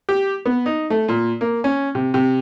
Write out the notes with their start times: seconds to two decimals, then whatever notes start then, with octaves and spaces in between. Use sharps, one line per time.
0.09 G4
0.46 B3
0.66 D#4
0.90 A3
1.08 A#2
1.41 A#3
1.64 C#4
1.95 C3
2.14 C3